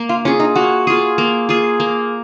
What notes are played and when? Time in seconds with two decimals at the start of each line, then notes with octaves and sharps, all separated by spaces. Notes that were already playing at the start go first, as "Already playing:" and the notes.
Already playing: A#3
0.09 F4
0.25 C#4 F4 G#4
0.40 D#4
0.55 A#3 F#4
0.87 F4 G#4
1.18 A#3
1.49 F4 G#4
1.80 A#3